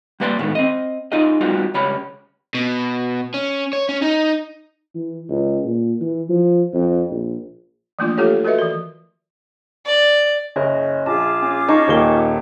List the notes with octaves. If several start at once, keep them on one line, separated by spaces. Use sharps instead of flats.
G3 A#3 B4 D5 F#5 C6
A2 D#3 G#3 B3
C4 D#5
D#4 F4 G#4 D#5
G3 B3 D#4 F4 F#4
C#2 G3 C#5 B5
B2
C#4
C#5
C#4
D#4
E3
C#2
A#2
E3
F3
F2
A#1
E3 F3 A3 A#3 D4 F4
G3 A3 F4 G4 A4 C#5
A3
F#4 A4 B4 D#5 E5
E3 A#4
D5
F#1 C#4 C#5 D#5
A#1 F4 G#4 A5 D6
C#4
D#4 A5 C#6
D#1 A#2 G7